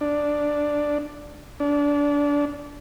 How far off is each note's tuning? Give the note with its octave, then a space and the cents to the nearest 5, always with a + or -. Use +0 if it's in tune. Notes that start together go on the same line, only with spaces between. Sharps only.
D4 +0
D4 -25